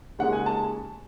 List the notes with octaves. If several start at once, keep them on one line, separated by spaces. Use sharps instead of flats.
D#2 C#3 G#3 F#5
G#5
A5